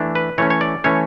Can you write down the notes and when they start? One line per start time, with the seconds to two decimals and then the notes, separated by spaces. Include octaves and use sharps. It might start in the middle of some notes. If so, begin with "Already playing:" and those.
Already playing: E3 A3 D4
0.15 B4
0.38 E3 A3 C#4 C#5
0.50 C#5
0.61 D5
0.84 E3 A3 C#4 C#5